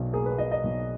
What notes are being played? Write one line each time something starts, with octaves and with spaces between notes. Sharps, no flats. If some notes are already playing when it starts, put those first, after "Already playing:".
Already playing: B1 B2
A#3 G#4
B4
B2 D#5
D#5
B1